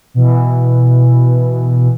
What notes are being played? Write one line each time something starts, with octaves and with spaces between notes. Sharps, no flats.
B2 E3